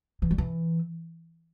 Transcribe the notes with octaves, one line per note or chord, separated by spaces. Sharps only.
E3
G3
E3